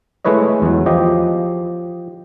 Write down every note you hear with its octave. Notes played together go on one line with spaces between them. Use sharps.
G#3 A3 E4 B4 C#5 D#5
E2 F#3
F3 G4 D#5